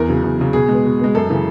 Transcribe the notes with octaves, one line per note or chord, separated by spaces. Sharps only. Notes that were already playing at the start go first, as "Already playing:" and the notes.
Already playing: E2 A#4
C#3 F#3
E2
C#3 F#3
B2 G#4
G#3 B3
B2
G#3 B3
F#2 A4
C#3 E3